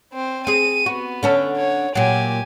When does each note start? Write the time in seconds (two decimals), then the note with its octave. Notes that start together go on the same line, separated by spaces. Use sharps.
0.13 C4 C5
0.47 C4 G#4 D#7
0.86 B3 F#4
1.23 D3 C#4 A4
1.57 C#5
1.95 A#2 F#3 G4 G#5